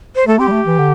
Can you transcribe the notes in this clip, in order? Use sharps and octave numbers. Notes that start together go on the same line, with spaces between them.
C5
A3 A4
C4 G4
G3
A3
E3
D3